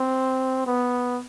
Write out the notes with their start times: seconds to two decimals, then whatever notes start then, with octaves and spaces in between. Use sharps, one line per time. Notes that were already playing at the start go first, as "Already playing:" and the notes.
Already playing: C4
0.67 B3